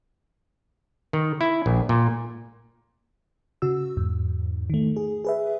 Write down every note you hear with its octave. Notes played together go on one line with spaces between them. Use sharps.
D#3
E4
A#1
A#2
C#3 F#4 E6
E2 G#2
D#3 A3
G#4
G#4 B4 E5